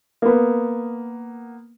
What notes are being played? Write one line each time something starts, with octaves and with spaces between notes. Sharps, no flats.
A#3 B3